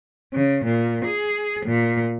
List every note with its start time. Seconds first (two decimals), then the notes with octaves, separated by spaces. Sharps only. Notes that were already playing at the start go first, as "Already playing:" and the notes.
0.33 C#3
0.65 A#2
1.06 G#4
1.66 A#2